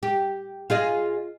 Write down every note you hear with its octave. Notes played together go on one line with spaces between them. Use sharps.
G4
F4 G#4 D#5